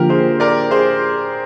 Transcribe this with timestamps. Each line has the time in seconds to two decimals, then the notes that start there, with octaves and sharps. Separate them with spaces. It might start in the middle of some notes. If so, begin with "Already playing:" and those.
Already playing: D3 F3 A#3 F4 G4 A#4
0.09 G#4 C5
0.40 A#4 D5
0.71 G#4 C5